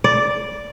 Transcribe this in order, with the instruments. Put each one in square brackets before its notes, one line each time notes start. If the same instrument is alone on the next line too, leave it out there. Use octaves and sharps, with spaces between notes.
[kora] D5